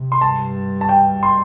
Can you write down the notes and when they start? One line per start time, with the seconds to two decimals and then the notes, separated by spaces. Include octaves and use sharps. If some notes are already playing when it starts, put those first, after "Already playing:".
Already playing: C3
0.12 C6
0.21 G2 A5
0.81 A5
0.89 G5
1.23 C6